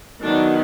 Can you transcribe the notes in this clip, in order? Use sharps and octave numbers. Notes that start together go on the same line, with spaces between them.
D#3 F#3 B3 D4